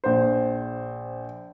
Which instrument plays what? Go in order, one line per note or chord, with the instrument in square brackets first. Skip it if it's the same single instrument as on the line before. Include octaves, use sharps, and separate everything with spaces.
[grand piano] A#1 C5